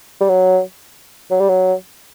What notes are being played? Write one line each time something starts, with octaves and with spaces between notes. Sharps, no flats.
G3
F#3
F#3
G3
F#3